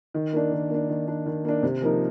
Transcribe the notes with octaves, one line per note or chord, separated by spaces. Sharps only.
D#3
A#3 D4
D#3
A#3 D4
D#3
A#3 D4
D#3
A#3 D4
C3
F3 A#3 D#4 A#4